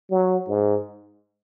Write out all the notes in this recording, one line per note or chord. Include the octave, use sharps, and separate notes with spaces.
F#3
G#2